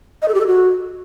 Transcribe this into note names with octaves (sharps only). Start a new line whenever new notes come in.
D#5
A4
G4
A4
F#4